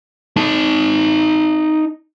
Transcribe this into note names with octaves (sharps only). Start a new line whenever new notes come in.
D#4 A5